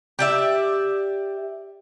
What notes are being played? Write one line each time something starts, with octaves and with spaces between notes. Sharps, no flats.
G4 D5 E5